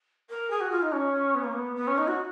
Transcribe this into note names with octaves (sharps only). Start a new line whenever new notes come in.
A#4
G#4
F#4
F4
D#4
C#4
B3
A#3
B3
B3
C#4
D#4
F#4